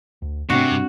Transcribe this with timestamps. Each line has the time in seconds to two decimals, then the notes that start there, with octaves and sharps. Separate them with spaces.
0.22 D2
0.50 G#2 C3 A3 C4 D4 F#4
0.71 G2